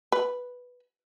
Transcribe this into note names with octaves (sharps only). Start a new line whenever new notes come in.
B4